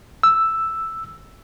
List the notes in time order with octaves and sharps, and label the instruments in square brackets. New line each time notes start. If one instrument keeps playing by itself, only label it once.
[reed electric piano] E6